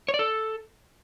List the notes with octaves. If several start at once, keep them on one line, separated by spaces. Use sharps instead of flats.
C#5
D5
A4